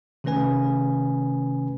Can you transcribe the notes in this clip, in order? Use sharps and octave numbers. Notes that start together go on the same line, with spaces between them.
C3 D#3 A3 C#4 B4 G#5